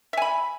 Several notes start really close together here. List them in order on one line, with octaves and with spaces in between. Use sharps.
E5 G#5 B5